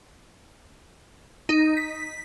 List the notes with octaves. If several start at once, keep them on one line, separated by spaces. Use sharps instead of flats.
D#4
B6